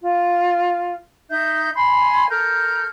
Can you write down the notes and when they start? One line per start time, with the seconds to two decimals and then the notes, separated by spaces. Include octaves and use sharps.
0.01 F4
1.30 D#4 E5 G6
1.74 G#5 B5 C6
2.30 A4 A#4 F6 G6